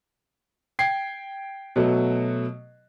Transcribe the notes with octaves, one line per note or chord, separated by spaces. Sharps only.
G5 G#6 C7
B2 F#3 A3